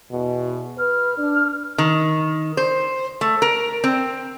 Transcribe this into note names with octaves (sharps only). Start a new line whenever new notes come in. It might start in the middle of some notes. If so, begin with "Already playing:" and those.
E2 B2
B4 F6
D4
D#3
C5
A3
A#4
C4